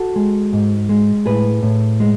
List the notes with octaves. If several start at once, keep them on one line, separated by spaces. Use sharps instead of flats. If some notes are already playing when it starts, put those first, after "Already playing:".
Already playing: F#4 A4
G#3
G#2
G#3
A2 G#4 B4
A2
G#3